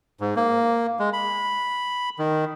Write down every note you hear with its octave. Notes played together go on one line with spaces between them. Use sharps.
G#2
A#3
G#3
B5
D#3